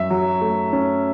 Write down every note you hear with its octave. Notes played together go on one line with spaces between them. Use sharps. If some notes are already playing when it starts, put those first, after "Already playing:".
Already playing: F#2 E5
F#3
A3
C#4